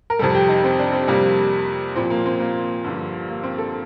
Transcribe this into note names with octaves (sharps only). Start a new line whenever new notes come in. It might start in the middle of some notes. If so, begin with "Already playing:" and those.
A#4
F2 C3 G3 A4
G4
D#4
C4
D4
C4
F2 C3 G3 A#3
A#2 F3 C4
A#3
C4
A#3
G2 D3 F3
A#3
C4
A4